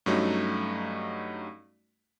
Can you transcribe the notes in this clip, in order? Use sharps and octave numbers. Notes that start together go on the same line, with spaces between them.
G2 F#3 A3 C#4 D#4 F#4